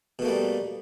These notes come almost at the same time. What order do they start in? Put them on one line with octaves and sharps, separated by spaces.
B2 A3 A#3 G3